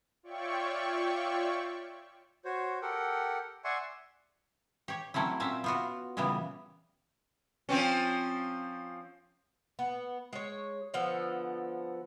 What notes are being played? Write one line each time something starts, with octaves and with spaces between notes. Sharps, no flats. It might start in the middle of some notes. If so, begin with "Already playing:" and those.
F4 C#5 D5 E5 G5 C#6
F#4 C5 C#5
G4 A4 A#4 F#5 G5
D5 E5 F#5 G#5 C6 C#6
G4 C#5
F#3 A3 C4 C#4 E4
A#2 C4 C#4 E5
B3 F4 F#4
A#2 C#3 E3 G3 B3
F3 C4 C#4
B3
G#3 C#5
D3 F3 B3 A4